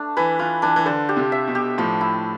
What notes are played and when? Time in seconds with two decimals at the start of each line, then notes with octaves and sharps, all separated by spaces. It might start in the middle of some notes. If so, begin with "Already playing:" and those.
Already playing: A3 D4
0.17 E3 B4
0.39 E3 F4
0.62 E3 D4
0.76 E3
0.86 D3 C5
1.09 G4
1.17 C3
1.32 E5
1.47 B2
1.55 G4
1.78 A2 F3
2.01 E4